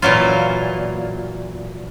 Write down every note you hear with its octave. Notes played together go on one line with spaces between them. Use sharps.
A#2 E3 F#3 F4